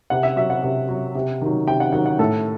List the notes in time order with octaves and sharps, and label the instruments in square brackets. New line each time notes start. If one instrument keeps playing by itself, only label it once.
[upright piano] C3 F#5
E5
F#3 E5
F#5
C3
F#3
C3
D#3 F#3
C3 G5
F#5
D#3 F#3 F#5
F#5
A2 A4